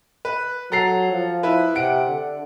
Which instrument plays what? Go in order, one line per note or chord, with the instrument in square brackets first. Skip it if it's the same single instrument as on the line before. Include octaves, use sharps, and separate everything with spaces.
[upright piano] B4
[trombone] F#3 [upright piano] A4 A#5 C7
[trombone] F3
[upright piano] E4 B4
[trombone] C3 [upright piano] F#5 D7
[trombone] D3